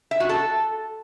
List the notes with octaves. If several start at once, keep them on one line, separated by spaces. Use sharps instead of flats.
E5
F#4
A4